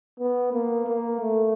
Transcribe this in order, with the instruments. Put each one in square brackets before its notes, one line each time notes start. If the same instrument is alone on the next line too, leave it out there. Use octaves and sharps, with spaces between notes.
[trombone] B3
A#3
A#3
A3